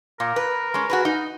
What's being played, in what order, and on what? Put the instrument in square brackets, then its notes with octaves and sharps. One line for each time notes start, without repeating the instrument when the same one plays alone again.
[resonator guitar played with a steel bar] A#2 [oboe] A#4
[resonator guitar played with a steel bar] B4
G#3 C#4
F#4 G#4 B4
D#4